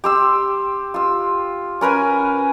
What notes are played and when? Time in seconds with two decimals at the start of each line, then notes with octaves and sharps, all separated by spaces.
0.04 G4 C6 E6
0.94 F4 E6
1.81 C#4 A#4 B4 G#5